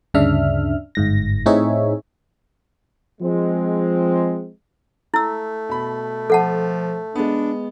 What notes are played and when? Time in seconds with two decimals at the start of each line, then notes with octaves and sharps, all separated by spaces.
0.14 D2 G2 C#3 D4 E5 F6
0.95 G1 G#2 A#6
1.46 A2 C4 D#4 G#4 C#5 E5
3.21 F3 G#3 C4
5.14 A3 E4 E6
5.69 B2 B5
6.30 F3 A4 F#5 A5
7.15 G#3 B3 D4